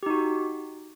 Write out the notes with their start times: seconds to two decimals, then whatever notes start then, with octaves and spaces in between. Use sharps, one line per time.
0.03 G4
0.06 D#4
0.10 F#4